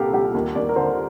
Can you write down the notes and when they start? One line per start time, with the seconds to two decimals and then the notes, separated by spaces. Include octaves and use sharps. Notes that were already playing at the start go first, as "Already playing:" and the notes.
Already playing: C2 A#2 C4 G4 A4 A#4 F5
0.13 G3 G4
0.34 D#2
0.55 D#2 D5
0.69 A#4
0.76 D3 C5